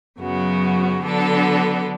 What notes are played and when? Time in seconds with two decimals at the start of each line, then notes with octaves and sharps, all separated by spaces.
0.20 F#2 C#3 F#3 B3 F#4
1.03 D3 F#3 B3 D4 A4